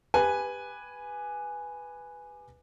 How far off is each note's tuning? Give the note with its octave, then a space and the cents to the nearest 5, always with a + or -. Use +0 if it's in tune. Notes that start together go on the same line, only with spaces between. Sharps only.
G4 +20 B4 +0 G#5 +0